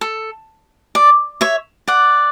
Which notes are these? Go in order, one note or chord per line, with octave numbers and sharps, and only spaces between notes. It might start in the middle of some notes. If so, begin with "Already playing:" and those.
A4
D5
C#5 E5
D5 F#5